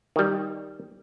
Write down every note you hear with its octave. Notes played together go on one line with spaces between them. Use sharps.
D#3 G3